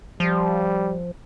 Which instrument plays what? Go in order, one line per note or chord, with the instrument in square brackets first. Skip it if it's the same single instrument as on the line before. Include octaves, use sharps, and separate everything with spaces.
[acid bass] F3 [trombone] G3